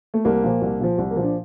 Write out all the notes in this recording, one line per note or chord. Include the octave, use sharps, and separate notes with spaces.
A3
C2 A#3
A#2 F3
C2
A#2 F3
C2
A#3
A#2 F3
D4